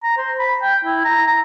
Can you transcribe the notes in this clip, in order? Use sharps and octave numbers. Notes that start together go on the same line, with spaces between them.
A#5
C5
B5
G5
E4
A#5
A#5